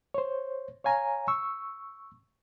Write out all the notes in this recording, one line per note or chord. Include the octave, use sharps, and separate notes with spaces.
C5 C#5
C#5 F5 G#5 A#5
C#6 E6